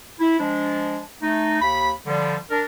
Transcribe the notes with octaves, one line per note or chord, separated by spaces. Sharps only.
E4
F3 G#3 D4
A3 D#4
D#2 B5
D3 F3 G3
D4 A#4